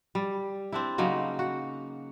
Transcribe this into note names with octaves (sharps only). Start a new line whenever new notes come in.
G3
C4 D4 E4
C#3 F#3 A#3 D#4
F#4